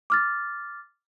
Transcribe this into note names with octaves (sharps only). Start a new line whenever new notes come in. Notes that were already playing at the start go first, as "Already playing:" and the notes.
D6 F6 A6